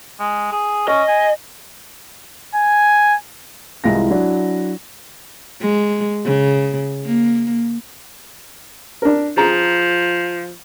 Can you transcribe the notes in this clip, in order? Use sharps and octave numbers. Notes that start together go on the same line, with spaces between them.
G#3
G#4
C#4 D#5
G#5
G#5
C2 E3 G#3 F4 A#6
F#3 D4 E4
G#3
C#3
A#3
D4 A#4
F3 G#4 A#5